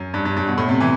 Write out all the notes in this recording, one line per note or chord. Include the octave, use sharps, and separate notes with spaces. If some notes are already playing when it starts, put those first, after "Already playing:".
Already playing: F#2
G2
G2
G2
B2
A2
C3
E3